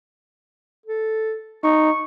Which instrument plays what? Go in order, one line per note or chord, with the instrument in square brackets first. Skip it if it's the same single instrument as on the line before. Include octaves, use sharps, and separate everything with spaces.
[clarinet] A4
[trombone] D#4 [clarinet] C#6